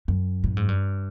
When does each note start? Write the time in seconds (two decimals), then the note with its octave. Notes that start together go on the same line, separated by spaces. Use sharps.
0.08 F#2
0.44 A2
0.57 G#2
0.68 G2